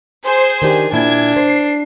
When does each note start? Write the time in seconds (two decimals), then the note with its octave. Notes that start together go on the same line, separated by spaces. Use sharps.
0.25 G#4 C5
0.62 D#3 D4 G4
0.93 A#2 D4 E4 G#6
1.36 C5 C7